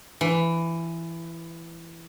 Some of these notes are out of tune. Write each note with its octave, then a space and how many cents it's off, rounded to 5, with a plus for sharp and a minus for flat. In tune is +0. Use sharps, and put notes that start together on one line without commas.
E3 +15